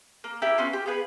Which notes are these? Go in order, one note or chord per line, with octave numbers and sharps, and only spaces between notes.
A#3
E4 G4 A#4 G5
B3 C#4 F4 C6
G4
B3 F4 G#4 B4